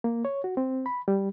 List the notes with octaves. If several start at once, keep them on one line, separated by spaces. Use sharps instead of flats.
A#3
C#5
F#4
C4
B5
G3